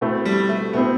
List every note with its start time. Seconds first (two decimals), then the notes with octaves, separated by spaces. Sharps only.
0.01 B2 A3 C4 E4
0.25 G3
0.49 A3
0.73 B2 A3 B3 C4 E4